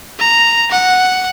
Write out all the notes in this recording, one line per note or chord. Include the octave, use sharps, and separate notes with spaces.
A#5
F#5